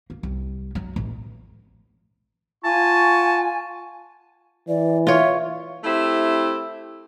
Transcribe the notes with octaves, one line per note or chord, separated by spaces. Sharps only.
A#3
C2
F#3
A1
F4 F#5 G#5 A5 C#6
E3 D5
F4 C#5 E5
A3 C4 E4 G4